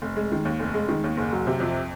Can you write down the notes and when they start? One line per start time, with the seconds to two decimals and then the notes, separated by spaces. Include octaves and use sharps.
0.02 F1
0.16 G#3
0.32 D#3
0.45 D#2
0.60 F1
0.74 G#3
0.89 D#3
1.04 D#2
1.17 F#1
1.33 F#3
1.47 C3
1.60 F2